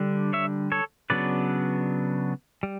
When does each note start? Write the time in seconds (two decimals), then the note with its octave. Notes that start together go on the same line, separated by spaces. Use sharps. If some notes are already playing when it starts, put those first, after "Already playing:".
Already playing: D3 G3 D4
0.33 C#5 E5
0.72 A4 C#5
1.10 C#3 F#3 B3 D4 B4 D5
2.63 G3